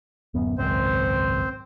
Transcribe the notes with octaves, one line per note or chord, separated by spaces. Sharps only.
D1 F#2 B3
G#1 C#2 F#2 C4 C5